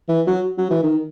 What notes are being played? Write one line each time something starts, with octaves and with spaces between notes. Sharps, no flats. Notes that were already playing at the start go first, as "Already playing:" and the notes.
E3
F#3
F#3
E3
D#3